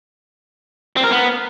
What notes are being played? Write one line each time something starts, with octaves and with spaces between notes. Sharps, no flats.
C4
A#4
B3